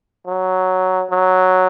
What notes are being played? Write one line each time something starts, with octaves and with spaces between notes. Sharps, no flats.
F#3
F#3